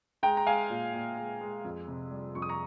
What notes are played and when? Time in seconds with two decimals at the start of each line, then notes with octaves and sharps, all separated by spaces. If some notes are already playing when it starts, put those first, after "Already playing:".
0.23 G#3 G5 A#5
0.37 A#5
0.47 G#3 F5 G#5
0.70 A#2
0.94 A#2
1.17 G#3
1.41 G#3
1.64 F2
1.88 C3
2.11 G3
2.35 F2 C#6
2.42 D#6
2.49 A#5 C#6